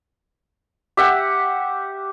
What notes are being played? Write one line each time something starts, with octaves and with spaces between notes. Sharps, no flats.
G4 E5 F#5